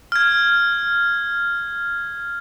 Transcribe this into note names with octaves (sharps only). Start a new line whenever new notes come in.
F6 G#6